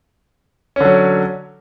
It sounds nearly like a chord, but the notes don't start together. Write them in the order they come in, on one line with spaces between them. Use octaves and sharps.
C#4 D3 F#3